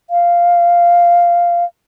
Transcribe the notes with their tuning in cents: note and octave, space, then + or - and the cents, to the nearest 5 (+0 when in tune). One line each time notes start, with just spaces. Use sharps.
F5 -5